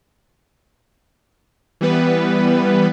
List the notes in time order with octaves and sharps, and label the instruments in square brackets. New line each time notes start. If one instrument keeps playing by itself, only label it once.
[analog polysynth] E3 G3 B3 B4